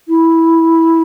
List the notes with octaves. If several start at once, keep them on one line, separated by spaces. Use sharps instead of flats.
E4